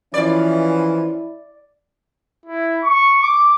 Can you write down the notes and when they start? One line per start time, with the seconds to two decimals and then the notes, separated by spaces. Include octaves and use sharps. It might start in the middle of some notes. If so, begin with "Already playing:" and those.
0.14 E3 F3 C#4 E4 D5
2.46 E4
2.83 C#6
3.22 D6